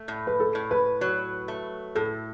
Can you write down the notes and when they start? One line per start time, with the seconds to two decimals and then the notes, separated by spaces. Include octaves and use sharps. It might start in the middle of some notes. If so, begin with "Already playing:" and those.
Already playing: A3
0.08 A2
0.27 B4
0.40 A4
0.55 A2
0.71 B4
1.01 F#3
1.48 A3
1.95 A2 A4